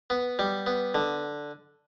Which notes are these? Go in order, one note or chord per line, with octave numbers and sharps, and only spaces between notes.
B3
G3
B3
D3